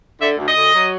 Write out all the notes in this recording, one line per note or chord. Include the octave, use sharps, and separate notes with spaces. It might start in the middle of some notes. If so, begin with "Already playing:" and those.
D3 E5
D2
D#5
D2
F#3